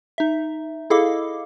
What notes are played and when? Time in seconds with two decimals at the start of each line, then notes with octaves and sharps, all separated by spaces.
0.18 D#4 E5
0.90 E4 G#4 A4 D#5 F5 D6